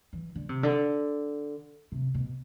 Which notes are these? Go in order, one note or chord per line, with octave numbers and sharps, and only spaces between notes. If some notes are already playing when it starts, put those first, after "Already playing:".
E3
D3
C3
D3
C3
B2